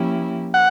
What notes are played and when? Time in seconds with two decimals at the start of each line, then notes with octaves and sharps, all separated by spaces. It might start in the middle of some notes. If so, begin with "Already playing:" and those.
Already playing: F3 A#3 C#4 E4 G4
0.54 F#5